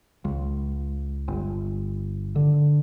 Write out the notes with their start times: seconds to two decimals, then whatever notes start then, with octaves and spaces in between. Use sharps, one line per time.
0.25 C#2
1.28 G1
2.36 D3